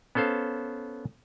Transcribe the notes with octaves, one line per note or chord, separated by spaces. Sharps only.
B3 C#4 A4 C5 F5